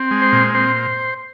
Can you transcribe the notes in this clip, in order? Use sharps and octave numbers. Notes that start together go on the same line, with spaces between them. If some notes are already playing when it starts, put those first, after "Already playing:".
Already playing: C4
G#3
C5
A#2
C4 C5